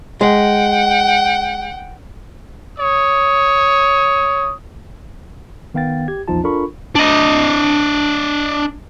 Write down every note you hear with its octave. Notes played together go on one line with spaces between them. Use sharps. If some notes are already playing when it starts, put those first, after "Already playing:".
G#3 F#5 G5
C#5 D#6
D#3 B3 F5 G5 A6
G4 G#6
A#1 E2 F3 D#4 F4 A5
D4 F4 A4 A#4 B5 C#6
D4 D#5